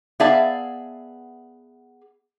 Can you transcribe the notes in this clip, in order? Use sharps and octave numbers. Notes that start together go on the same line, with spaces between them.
B3 G#4 D5 E5 F5 A5